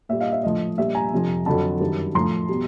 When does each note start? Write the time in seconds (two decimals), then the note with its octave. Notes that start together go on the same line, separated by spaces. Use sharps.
0.09 A#2 E5
0.13 G3
0.20 D#5 F5
0.32 E5
0.43 A2 F3 D#5
0.78 A#2 G3 E5
0.95 G#5 A#5
1.12 F2 C3 F3
1.46 F2 D3 F#3 A5 B5
1.80 F#2 D#3 G3
2.15 A2 F3 A#5 C6
2.49 B2 G3